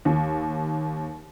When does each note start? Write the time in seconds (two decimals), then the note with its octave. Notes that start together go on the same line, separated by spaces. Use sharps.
0.05 D#2